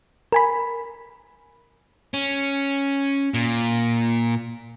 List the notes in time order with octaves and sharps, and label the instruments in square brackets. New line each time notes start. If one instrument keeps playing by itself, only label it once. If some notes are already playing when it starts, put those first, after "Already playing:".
[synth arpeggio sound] A#4 G#5 B5
[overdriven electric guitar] C#4
A#2